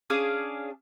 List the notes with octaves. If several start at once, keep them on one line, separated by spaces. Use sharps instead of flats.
C#4 D4 G#4 F5